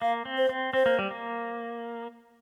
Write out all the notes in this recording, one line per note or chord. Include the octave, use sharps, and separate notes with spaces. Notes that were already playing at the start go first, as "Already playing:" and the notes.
A#3 F5
C4
C5
C4
C4 C5
A#3
G3
A#3